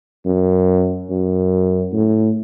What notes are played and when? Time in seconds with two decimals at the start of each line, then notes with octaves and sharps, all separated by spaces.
0.26 F#2
1.10 F#2
1.93 A2